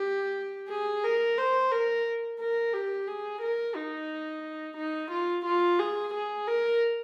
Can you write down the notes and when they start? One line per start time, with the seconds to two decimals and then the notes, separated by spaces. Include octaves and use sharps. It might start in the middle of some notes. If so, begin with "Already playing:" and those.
Already playing: G4
0.70 G#4
1.04 A#4
1.38 C5
1.71 A#4
2.39 A#4
2.73 G4
3.08 G#4
3.41 A#4
3.75 D#4
4.77 D#4
5.11 F4
5.45 F4
5.79 G#4
6.14 G#4
6.47 A#4